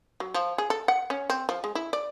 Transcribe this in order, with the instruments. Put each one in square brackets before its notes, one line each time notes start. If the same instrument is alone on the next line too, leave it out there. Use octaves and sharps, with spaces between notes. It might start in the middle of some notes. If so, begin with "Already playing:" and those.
[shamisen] F#3
F3
G#4
A4
F#5
C#4
C4
F3
G#3
E4
D5